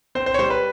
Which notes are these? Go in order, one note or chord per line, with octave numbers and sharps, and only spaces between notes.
C4 C5
C5
C#5
G3 C5
B4